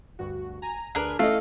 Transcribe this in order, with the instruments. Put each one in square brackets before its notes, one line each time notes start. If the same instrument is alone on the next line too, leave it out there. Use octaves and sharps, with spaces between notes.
[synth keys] D2 G2 F#4
G#5 A#5
[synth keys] D2 B4 [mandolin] D4 G#4 A#4
[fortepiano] A3 [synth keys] C#4 E4 D#5 [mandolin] F5